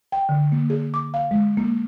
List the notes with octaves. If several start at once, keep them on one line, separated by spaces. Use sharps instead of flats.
G5
D3
A#3
G#4
D6
F5
G#3
A#3